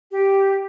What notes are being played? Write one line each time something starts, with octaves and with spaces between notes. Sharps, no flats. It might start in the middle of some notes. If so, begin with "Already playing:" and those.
G4